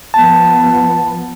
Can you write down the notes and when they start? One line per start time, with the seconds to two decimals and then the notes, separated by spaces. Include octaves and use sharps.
0.14 F3 B3 A5